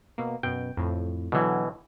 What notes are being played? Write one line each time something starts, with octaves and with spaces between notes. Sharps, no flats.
B2 A#3
F#2 B2 G5
F2 A2
B2 D3 E3 F#3